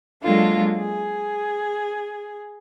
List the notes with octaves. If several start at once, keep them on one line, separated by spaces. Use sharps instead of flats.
F#3 G#3 A#3 D4 F4 A4
G#4